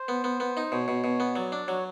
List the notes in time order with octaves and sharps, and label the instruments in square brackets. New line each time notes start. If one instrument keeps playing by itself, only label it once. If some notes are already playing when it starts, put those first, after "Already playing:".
Already playing: [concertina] C5
[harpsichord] B3
B3
B3
D#4
[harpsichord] B2 [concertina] C#5
[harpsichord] B2
B2
B3
[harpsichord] F#3 [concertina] D5
[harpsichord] D4 [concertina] D5
[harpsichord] F#3 [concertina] C#5